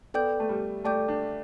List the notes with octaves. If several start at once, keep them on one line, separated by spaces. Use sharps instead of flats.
B3 A4 D5 G5 D6 G6
A3
G3
A3 A4 D5 G5 D6 G6
D4